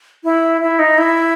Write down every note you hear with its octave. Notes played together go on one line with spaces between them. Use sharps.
E4
E4
D#4
E4